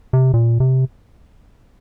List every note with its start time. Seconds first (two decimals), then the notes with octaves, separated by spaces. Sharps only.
0.13 C3
0.34 A#2
0.60 C3